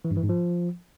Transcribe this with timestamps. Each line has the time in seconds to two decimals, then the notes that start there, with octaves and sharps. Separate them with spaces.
0.05 E3
0.11 G2
0.17 E3
0.23 G#2
0.29 F3